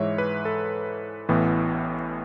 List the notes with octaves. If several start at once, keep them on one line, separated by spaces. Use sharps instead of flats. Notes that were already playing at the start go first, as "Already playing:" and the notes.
Already playing: G#2 E3 G#3 C#5 E5
B4
A4
A1 A2 E3 B3